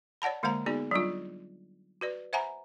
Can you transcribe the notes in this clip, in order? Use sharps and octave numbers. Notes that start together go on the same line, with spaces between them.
C#5 D5 F#5 A5 B5
D3 G#3 A#3 C5 F5 A#5
B3 D#4 F#4 G#4 D5
F#3 G3 D4 F4
F#4 B4 D5
C5 E5 F#5 G#5 A#5 B5